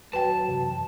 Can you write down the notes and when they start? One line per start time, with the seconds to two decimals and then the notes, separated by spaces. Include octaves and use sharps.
0.13 D#1 F#3 B4 G5 A5
0.48 F#2 C3 E3